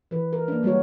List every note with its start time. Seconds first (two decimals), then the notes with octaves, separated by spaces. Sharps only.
0.11 E3 B4
0.33 A#4
0.48 A#3 D4
0.63 D3 G3 G#3 F#4 C#5